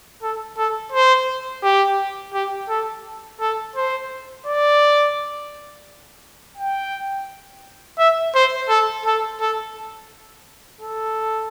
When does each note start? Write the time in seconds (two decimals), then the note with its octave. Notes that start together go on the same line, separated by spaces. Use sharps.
0.22 A4
0.58 A4
0.92 C5
1.63 G4
2.33 G4
2.69 A4
3.40 A4
3.76 C5
4.46 D5
6.57 G5
7.99 E5
8.35 C5
8.69 A4
9.05 A4
9.41 A4
10.81 A4